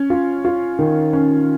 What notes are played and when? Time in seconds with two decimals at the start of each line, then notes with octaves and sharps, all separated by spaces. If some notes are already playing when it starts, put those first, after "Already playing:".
Already playing: C#4
0.10 F4
0.45 F4
0.79 D#3
1.13 C#4